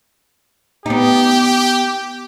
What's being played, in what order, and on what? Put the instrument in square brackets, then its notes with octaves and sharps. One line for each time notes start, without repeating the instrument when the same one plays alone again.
[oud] B3 D#4 [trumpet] G4